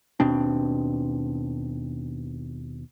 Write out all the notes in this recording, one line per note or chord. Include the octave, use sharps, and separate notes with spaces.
D#2 B2 C4 D4